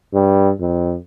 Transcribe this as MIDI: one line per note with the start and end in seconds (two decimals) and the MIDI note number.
0.13 0.51 43
0.61 0.96 41